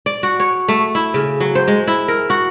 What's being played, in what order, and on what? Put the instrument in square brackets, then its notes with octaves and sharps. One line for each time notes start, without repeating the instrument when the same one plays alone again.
[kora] D5
F#4
C#5
A3
E4
C#3
F#3
C5
G#3
E4
A#4
F#4